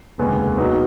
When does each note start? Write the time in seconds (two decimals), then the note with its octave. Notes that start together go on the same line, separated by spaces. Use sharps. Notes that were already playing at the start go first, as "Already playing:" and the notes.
0.18 F1 D#2 C#3 G#3 B3
0.56 B2 F#3 B3 D#4 F#4